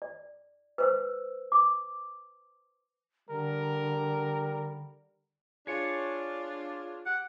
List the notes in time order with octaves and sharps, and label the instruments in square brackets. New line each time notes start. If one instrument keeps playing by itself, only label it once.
[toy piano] D5
B4 C5 E6
D6
[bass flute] D3 [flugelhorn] G3 [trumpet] A#4
[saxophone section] D4 F4 [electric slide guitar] G#4 C#5
[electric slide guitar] G4 [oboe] F#5